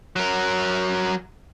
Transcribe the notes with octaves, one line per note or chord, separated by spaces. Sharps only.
F#3 A#4